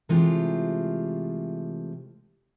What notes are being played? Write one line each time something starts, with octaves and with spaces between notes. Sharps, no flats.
C3 E3 G#3 A3 F4 G4